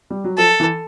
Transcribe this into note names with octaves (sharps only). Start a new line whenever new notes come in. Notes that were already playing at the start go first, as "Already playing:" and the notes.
G3
F#3
F3 A4
E3